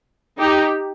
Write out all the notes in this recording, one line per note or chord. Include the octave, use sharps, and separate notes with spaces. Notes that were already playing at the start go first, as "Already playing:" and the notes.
D#4 G4